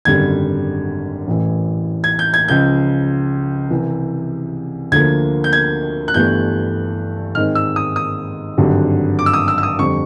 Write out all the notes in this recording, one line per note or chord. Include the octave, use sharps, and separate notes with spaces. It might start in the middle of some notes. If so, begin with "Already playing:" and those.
G#1 F#2 D3 G3 G#6
A1 A2 E3
G#6
G6
G#6
C#2 C#3 F3 G6
C2 C3 E3
D2 D3 F3 A#3 G#6
G6
G#6
F#6
G1 G2 E3 A3 G6
G#2 D#3 G#3 C4 F6
E6
D#6
D#6
G#1 G2 D3 F#3
D6
E6
D#6
E6
E6
D#6
F2 D3 G3 C4 C#6